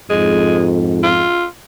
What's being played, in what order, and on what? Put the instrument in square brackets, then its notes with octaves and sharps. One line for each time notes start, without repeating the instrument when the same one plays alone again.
[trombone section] F2 G#2 [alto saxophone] G#3
[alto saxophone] F4